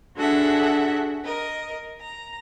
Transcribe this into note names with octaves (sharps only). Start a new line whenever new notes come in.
D4 F#4 G#4 A4 E5 F#5
A#4 D#5
A#5